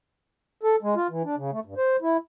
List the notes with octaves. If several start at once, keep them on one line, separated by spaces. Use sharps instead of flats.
A4
G#3
F4
E3
D4
C#3
A3
G2
C5
E4